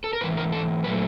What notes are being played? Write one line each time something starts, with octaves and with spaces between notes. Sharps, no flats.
A4
A#4
G#2 E3 B4
A#4
A4
A#2 F#3 A3 B4